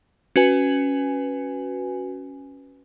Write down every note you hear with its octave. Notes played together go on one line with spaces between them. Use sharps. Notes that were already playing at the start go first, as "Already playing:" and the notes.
C#4 F#4 B4 G#5